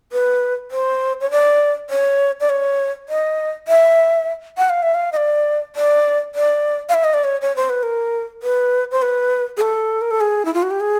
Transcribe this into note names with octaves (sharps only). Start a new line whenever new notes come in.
B4
C5
C#5
D5
C#5
D5
C#5
D#5
E5
F#5
F5
E5
F5
D#5
D5
D5
D5
F5
E5
D#5
D5
C#5
C#5
C5
B4
A#4
B4
C5
B4
G#4
A4
A#4
A4
G#4
E4
F4
F#4
G4
G#4